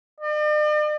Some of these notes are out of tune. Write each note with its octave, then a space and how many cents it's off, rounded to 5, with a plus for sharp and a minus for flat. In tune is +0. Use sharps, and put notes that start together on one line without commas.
D5 +45